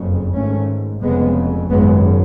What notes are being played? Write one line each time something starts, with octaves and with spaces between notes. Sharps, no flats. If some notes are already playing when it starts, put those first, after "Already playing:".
Already playing: F#1 F2 C#3
G#1 G#2 A3 C#4
F1 F2 C#3 G#3 B3
G#1 F#2 C#3 G#3 B3